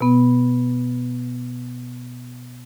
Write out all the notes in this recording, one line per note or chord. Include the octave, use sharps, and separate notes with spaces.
B2 B3